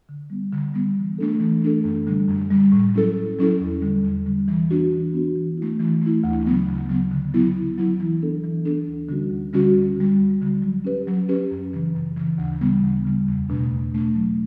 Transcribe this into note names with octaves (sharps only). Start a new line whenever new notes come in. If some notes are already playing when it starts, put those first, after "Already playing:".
D3
G3 B3
D3
G3 B3
E3
A3 D4 A4
E3
A3 D4 A4
F#2
D3 G3
F#2
D3 G3
A2
F#3 C#4 E4 A4
A2
F#3 C#4 E4 A4
E2
D3 G3
E2
D3 G3
E3
B3 D4 F#4
E3
B3 D4 F#4
E3
A3 E4
E3
A3 E4
D2
C#3 F#3 B3
D2
C#3 F#3 B3
D3
F#3 B3 E4
D3
F#3 B3 E4
E3
B3 D4 A4
E3
B3 D4 A4
D2
D3 G3 C#4 F#4
D2
D3 G3 C#4 F#4
D2
D3 G3
D2
D3 G3
F#3
C#4 G4 B4
F#3
C#4 G4 B4
F#2
C#3 E3
F#2
C#3 E3
D2
C#3 G3 B3
D2
C#3 G3 B3
E2
B2 A3 D4
E2
B2 A3 D4
F#3